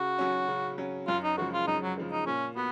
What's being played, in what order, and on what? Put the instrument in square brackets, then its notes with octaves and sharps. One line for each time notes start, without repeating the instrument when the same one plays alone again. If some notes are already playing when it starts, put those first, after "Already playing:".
Already playing: [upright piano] C#3 [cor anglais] F#4
[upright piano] F#3 C#4
C#3
F#3 C#4
[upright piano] F#2 [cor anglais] F4
[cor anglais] D#4
[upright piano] C#3 F3 G#3 [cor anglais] F#4
[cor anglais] F4
[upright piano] F#2 [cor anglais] D#4
[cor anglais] F#3
[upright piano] C#3 F3 G#3
[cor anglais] D#4
[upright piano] A#2 [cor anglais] C#4
[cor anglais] B3 [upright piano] F#4